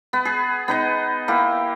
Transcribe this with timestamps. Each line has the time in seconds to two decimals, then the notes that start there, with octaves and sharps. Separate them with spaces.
0.13 B3
0.25 G#4
0.68 B3 D#4 D#5
1.28 A#3 E4 G4